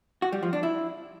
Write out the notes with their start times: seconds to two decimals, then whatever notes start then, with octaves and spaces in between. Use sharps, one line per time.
0.22 F#4
0.32 G3
0.43 F3
0.53 D4
0.63 E4